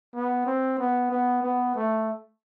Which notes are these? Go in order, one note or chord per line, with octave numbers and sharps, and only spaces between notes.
B3
C4
B3
B3
B3
A3